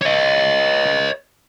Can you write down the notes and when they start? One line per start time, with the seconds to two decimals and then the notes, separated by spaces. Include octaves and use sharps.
0.02 C#5 D#5